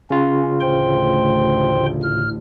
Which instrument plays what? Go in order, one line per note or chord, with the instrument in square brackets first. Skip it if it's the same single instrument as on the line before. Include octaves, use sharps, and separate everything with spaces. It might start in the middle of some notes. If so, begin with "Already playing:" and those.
[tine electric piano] C#3 F4 [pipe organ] C#4
[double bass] A1 D2 [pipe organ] C5 G5 C6
[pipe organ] A2 F6